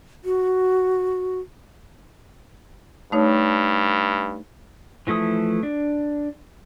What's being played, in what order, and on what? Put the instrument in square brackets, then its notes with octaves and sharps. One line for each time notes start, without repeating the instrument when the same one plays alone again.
[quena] F#4
[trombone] G2 [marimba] A3 D#4 C#5
[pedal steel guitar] E3 F3 A3 E4 D#6
D4